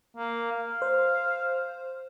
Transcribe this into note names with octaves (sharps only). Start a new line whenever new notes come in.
A#3
F5
C5